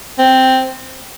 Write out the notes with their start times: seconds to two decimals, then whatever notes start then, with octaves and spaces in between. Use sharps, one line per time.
0.19 C4